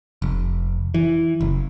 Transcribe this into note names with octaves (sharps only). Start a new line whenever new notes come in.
F1
E3
F#1